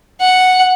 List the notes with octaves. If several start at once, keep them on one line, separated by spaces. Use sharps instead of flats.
F#5